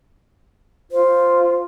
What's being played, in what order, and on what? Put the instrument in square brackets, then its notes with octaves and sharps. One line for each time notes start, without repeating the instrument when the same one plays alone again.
[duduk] F4 [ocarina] C5